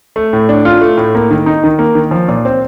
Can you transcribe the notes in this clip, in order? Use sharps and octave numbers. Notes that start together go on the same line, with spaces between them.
A3
A2
D4
F4
A3
A2
A#3
D#3
D#4
D#3
A#3
D#3
F3
A#2
C4